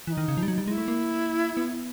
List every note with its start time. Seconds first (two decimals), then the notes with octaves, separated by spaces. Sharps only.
0.07 E3 E4
0.12 D#4
0.17 D#3
0.28 C#3
0.37 F3
0.43 G3
0.48 F#3
0.58 G3
0.67 G#3 E4
0.78 A3
0.88 A#3
1.57 B3